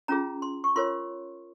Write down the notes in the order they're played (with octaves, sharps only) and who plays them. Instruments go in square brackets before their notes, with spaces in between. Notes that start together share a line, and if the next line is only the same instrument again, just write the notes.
[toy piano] C#4 F4 G#4 A#5
C6
C#6
F4 A#4 C#5 C6